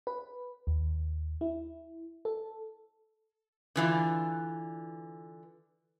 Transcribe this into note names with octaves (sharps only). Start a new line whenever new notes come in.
B4
D#2
E4
A4
D3 E3 F4